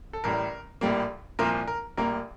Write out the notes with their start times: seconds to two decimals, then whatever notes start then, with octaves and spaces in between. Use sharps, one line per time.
0.13 A4
0.24 A1 A2 G3 A#4
0.81 A#1 A2 G3 A#3
1.39 C2 A#2 F3 A#3 A#4
1.67 A#4
1.97 A#1 A2 G3 A#3 A#4